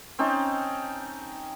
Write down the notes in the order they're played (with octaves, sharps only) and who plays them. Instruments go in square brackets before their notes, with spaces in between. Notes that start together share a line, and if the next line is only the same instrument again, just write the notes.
[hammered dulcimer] C4 C#4 D#4 A5